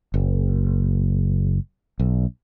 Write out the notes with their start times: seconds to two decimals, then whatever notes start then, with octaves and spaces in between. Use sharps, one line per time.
0.14 F#1
1.99 B1